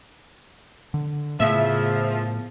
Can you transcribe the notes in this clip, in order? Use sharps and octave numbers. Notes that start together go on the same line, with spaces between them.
D3
A2 C#3 F3 A3 B3 E5